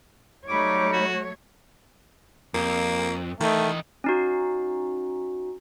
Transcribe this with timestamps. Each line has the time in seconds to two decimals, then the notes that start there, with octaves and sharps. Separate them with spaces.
0.48 F#3 G3 A3 D#4 C#5 B5 D6
0.93 F#4
2.54 F2 A#3
3.41 D#3 E3 A3 D#5
4.04 C#4 D#4 F#4